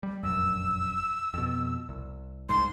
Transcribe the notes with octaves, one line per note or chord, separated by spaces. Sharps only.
G3
F1 A#1 F#2 E6
F2 B2
C2
C2 G#2 C6